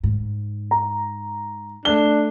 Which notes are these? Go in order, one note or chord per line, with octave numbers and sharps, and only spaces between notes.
G#2
A#5
A3 D4 G7